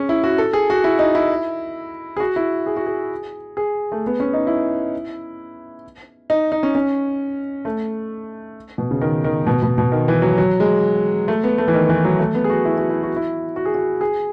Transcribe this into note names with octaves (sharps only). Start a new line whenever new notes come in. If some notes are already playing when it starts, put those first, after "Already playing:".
Already playing: C#4 G#4
E4
F#4
A4
G#4
F#4
E4
D#4
E4
G#4
F#4
E4
G#4
F#4
G#4
G#4
A3
B3
C#4
D#4
E4
D#4
D#4
C#4
C#4
A3
B2
C#3
D#3
D#3
B2
B2
B2
D#3
E3
F#3
F#3
G#3
A3
B3
A3
E3
D#3
E3
F#3
A3
B3
G#4
F#4
E4
F#4
E4
F#4
E4
F#4
G#4
F#4
G#4